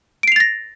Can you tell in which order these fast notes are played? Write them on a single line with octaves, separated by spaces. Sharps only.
D7 C7 F7 A6 A#6